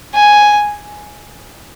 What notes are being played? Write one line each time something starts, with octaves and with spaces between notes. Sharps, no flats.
G#5